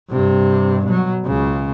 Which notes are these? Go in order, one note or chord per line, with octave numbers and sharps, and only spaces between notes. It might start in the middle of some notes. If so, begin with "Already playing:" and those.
G2 C3
B2 F#3
C#2 C#3